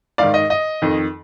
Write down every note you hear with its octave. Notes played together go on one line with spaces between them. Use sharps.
G#2 D#3 D5 F5
D#5
D#5
F2 D#3